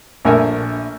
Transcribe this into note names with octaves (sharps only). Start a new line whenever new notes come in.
A#1 A3 A#4 E5 G#5